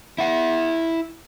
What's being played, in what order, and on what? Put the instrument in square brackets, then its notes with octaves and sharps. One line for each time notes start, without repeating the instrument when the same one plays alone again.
[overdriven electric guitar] E4 F#5